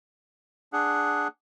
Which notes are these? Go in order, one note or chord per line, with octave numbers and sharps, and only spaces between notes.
D4 G#4 F#5